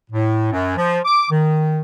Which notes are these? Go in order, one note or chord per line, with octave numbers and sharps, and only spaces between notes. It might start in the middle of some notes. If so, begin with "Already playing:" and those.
A2
F#2
F3
D6
D#3